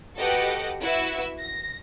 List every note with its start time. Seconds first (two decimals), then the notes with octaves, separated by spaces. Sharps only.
0.17 F#4 G4 A4 B4 D#5 F#5
0.81 E4 F#4 B4 E5 E6
1.39 A#6